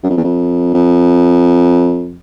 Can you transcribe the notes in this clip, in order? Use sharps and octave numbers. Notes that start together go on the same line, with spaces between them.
F#2
F2
E2
F2
F2